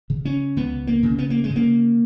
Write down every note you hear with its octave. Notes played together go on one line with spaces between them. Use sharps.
C#3
C#4
C#2 B3
A#3
C#3
B3
A#3
G#3
C#3
A#3